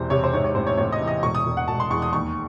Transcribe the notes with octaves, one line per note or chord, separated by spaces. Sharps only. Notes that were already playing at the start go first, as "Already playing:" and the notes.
Already playing: E1 E2 C3 C5
C3 C#5
C5
G#2 C#5
C#5
A1 C5
C#5
A1 C#5
D#5
E3
D#5
E1 C#6
D#6
E1
F#5
E1 A5
C6
E2 C#6
D#6
D#2 C#6